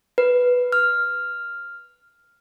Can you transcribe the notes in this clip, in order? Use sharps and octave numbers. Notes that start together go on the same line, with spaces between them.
B4
F6